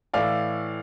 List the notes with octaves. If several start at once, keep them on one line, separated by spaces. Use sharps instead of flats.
A2 E3 D5 F5